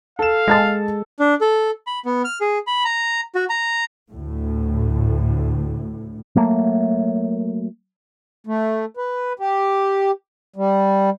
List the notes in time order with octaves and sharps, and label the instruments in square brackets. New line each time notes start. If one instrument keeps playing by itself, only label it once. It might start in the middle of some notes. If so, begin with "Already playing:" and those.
[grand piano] A4 E7 [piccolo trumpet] F5
[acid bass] G#3 [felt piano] D#5 A5 A6
[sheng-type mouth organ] D4
A4
B5
B3
F6
G#4
B5
A#5
F#4
A#5
[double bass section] D2 A2
[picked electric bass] F#3 A3 A#3
[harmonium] A3
B4
G4
G3